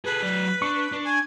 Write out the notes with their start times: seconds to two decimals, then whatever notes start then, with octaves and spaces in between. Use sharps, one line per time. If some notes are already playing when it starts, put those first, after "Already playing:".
0.05 G#4 A4 B4
0.23 F#3 D5
0.62 D4 C#6
0.92 D4
1.05 G#5